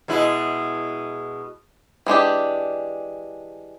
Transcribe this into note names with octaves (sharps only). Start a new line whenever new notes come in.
B2 G#3 E4
E3 G#3 D4 G4